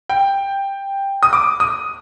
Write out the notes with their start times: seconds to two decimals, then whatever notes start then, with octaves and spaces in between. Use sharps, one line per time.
0.09 G5
1.23 D#6
1.33 D6
1.60 D#6